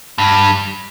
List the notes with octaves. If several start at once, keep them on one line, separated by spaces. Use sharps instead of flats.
G2